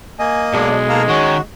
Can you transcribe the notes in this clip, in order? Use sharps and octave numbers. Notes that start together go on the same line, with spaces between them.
A#3 D#5 G#5
B1 G#3 D4
A#3 F5 A5 A#5
D#3 C#4 F#4